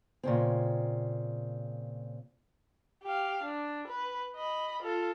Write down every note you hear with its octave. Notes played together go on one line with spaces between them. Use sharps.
A#2 C#3 C4
G4 F5
D4
B4
D#5 B5
F4 A4